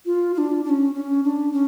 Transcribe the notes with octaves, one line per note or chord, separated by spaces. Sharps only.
F4
F4
D4
D4
C#4
C#4
D4
C#4